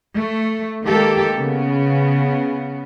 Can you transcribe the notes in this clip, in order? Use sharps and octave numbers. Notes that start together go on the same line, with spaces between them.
A3
D#3 G#3 A#3 G4 A4
C#3 B3